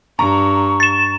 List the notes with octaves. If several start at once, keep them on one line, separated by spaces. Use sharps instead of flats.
G2 A#5 C#6
A6 E7